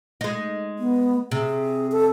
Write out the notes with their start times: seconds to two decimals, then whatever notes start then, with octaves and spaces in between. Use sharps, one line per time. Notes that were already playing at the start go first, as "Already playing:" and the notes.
0.21 G#3 D#4
0.79 B3
1.31 C3 G#4
1.92 A4